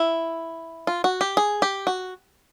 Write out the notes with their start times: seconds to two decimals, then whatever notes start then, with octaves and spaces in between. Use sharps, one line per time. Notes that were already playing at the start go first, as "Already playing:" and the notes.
Already playing: E4
0.87 F4
1.04 F#4
1.21 G4
1.37 G#4
1.62 G4
1.87 F#4